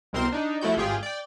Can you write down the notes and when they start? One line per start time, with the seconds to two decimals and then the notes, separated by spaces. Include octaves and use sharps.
0.13 C2 B2 C4 A#4 C5 C6
0.32 D4 D#4
0.61 F3 A3 E4 F#4 G6
0.77 G#1 F4 G4 G#4 G5
1.03 D5 G5